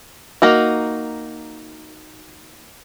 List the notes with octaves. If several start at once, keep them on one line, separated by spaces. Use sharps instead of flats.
A#3 D#4 F#4